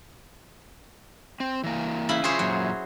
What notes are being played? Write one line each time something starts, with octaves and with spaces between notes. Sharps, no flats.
C4
E3 A#3
C#3 E4 B5
F4 G#4 C5 C#5 E5 G#5
F#2 A#2 F#3